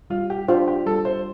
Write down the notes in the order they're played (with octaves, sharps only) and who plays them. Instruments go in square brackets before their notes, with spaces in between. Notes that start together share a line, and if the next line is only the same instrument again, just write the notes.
[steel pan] G3 [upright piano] F4
[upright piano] G4
[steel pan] D4 F4 C5 [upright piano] G4
[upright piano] G4
[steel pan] G3 [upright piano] A4
[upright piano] C5